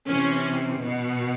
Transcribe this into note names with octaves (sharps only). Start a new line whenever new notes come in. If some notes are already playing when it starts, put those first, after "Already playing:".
C3 E3 C#4
B2